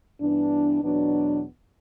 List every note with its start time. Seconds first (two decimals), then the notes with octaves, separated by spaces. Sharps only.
0.20 G2 E3 B3 D4
0.83 E2 B2 F#3 B3 D4